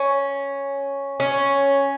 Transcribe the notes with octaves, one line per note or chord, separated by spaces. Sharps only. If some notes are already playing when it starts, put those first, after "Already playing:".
Already playing: C#4
C#4